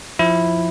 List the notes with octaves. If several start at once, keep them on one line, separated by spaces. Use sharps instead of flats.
F3 E4